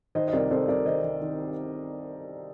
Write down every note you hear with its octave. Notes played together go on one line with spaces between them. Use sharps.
D#3 C5 D#5
D#5
C2 A#4 D5
C2 A4 C5
C2 A#4 D5
D#3 C5 D#5
D#3
D#3